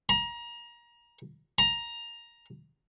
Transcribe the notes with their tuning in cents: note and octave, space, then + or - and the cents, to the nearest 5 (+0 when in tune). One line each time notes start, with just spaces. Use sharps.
A#5 +25
A#5 +10